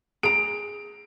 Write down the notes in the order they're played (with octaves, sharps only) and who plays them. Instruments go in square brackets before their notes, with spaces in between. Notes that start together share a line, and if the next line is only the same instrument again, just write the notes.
[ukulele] G#4 A#5 [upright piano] D7